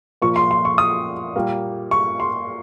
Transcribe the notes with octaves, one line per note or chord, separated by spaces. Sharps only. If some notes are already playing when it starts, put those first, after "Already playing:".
A#2 F3 A#3 C#6
C6
C6
C#6
D#6
A#2 G3 A#3
C#6
C6